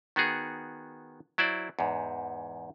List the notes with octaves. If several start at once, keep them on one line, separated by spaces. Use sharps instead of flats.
D#3 B3 F#4 G#4
F#3 E4 C5 D5
E2 G#2